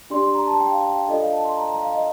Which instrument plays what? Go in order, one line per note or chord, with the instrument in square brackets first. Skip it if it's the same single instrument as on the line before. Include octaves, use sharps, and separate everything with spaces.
[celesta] D4 G4 D5 C6
C6
A#5
A5
G5
F5
G5
F5
D4 F4 A4 D5 D#5
F5
A5
C6
A#5
A#5
F5
D#5